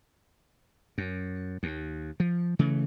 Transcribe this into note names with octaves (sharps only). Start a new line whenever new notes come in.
F#2
D#2
F3
C#3 E3 A3